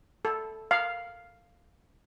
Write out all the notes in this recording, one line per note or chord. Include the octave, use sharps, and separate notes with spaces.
A4
F5